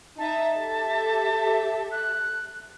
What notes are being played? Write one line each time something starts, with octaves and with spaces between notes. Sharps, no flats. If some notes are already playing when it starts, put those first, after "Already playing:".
D#4 E5 A5
G4 A4 E5
F#6